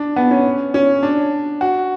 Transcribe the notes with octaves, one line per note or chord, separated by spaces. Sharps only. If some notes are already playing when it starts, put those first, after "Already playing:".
Already playing: D4
B3
C#4
C#4
D4
F#4